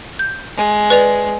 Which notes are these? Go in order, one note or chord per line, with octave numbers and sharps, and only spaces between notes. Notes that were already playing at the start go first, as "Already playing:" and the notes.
G6
G#3
B4 D5 F7